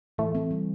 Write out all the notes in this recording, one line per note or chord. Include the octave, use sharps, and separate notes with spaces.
A2 E3 A3
C4
G3